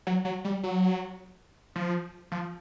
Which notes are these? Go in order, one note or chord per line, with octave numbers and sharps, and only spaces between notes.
F#3
F#3
G3
F#3
F3
F3